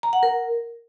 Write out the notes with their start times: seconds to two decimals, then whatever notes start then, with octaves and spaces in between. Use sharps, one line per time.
0.03 A#5
0.13 F#5
0.23 A#4